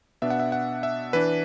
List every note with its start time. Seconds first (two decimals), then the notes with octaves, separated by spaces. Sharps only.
0.22 B2 B3 D4 E5
0.30 F#5
0.40 E5
0.52 F#5
0.83 E5
1.13 E3 D4 B4